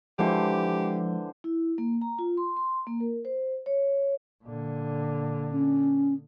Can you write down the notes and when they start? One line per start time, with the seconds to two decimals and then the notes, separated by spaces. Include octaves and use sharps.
0.19 D3 E3 F3 G#3 G4 C5
1.44 E4
1.78 A#3
2.02 A#5
2.19 F4
2.37 C6
2.57 C6
2.87 A#3
3.00 A#4
3.25 C5
3.66 C#5
4.44 A#2 D3
5.51 C#4